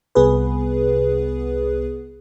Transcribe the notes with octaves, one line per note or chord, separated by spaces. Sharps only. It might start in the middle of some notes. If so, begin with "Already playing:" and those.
C2 B3 G#4 B4